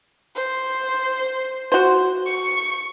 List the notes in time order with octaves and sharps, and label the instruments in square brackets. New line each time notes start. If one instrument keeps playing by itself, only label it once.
[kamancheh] C5
[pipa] F#4 C5
[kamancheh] C#6